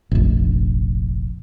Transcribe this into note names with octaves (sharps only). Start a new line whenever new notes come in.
F1 A#1